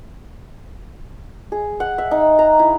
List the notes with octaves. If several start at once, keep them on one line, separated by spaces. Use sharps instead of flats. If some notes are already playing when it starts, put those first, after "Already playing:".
G#4
F#5
E5
D#4
A#5
E4